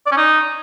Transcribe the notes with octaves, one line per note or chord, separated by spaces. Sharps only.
D5
C#4
D#4